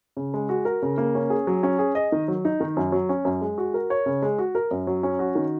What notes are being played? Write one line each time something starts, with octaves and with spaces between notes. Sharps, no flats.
C#3
G#3
F#4
A#4
C#3
A#3
C#4
G#4
F#3
C#4
G#4
D#5
D#3
F#3
D#4
D#3
F#2
F#3
C#4
F#2
G#3
F#4
A#4
C#5
C#3
G#3
F#4
A#4
F#2
F#3
C#4
F#4
D#3